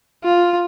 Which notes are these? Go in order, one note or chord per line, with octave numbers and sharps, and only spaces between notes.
F4